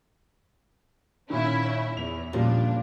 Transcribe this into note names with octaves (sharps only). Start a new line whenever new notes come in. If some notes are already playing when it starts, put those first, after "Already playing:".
A#2 D#3 C#4 E4 E5
E2 F7
A#2 C#3 F3 G3 D4